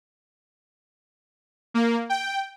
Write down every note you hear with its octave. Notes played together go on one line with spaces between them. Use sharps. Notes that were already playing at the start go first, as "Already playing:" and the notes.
A#3
G5